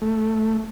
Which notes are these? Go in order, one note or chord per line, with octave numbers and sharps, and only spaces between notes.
A3